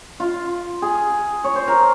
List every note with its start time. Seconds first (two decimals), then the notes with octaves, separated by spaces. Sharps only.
0.20 F4
0.82 G#4
1.44 C#5
1.55 C5
1.68 A#4